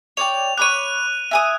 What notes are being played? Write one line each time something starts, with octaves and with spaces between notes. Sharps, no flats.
C#5 D5 G5 F7
C#5 B5 D6 F#6 D#7
E4 G#5 D#6